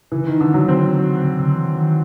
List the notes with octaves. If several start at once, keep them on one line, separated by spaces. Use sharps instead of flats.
C#3 E3
D#3
D3
F#3
C#3 C4
C#3
D3
E3
D#3